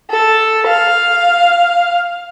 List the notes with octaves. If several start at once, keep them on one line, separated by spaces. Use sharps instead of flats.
A4
F5